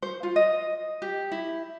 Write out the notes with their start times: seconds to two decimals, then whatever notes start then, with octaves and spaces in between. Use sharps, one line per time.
0.02 C5
0.23 F4
0.36 D#5
1.02 G4
1.32 E4